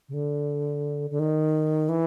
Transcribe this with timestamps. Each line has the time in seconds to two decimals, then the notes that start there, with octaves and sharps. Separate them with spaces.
0.09 C#3
0.14 D3
1.10 D3
1.19 D#3
1.89 E3